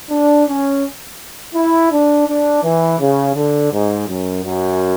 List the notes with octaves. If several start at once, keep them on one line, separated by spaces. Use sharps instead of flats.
D4
C#4
E4
D4
D4
E3
C#3
D3
G#2
F#2
F#2